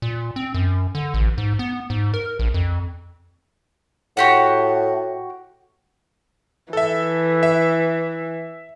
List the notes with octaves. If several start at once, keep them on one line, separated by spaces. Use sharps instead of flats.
A#2
C4
F#2
D3
A1
G#2
B3
G#2
A#4
A#1
F2
A2 F#4 G4 F#5
E3 A4 E5
E5